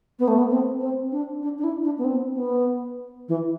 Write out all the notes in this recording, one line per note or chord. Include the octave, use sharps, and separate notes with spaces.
B3
A3
B3
C4
C4
D4
D4
D4
E4
D4
B3
C4
B3
E3